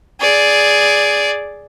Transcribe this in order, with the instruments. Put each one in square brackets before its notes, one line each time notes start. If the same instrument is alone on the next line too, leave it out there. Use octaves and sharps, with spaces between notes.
[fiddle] G#4 D5